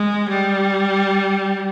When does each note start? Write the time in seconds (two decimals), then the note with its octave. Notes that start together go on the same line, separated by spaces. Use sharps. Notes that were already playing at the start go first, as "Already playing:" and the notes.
Already playing: G#3
0.29 G3